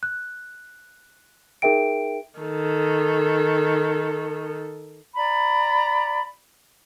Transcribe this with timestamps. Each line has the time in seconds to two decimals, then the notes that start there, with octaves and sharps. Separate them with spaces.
0.03 F#6
1.62 D#4 G#4 A#4 E5 G5 D7
2.40 D#3 A4
5.15 D5 A#5 B5